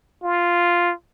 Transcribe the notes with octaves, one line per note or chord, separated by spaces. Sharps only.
F4